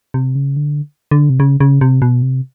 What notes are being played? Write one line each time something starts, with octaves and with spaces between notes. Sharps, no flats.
C3
C#3
D3
D3
C3
C#3
C#3
C3
B2
C3